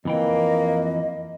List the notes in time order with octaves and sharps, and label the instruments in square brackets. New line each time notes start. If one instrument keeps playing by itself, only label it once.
[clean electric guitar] F2 E3 G5 [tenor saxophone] A#3 [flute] D#5